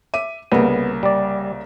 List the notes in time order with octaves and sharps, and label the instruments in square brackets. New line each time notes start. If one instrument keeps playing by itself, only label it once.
[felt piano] E5 D6 D#7
[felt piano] C2 C#3 A#3 [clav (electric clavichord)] B3
[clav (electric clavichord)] G3 D5